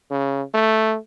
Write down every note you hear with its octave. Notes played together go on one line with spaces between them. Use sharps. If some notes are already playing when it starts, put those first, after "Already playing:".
C#3
A3